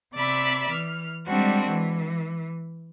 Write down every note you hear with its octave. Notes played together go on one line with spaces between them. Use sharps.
C3 D5 E5 B5
E3 F6
G3 G#3 C4 D4 F#4
E3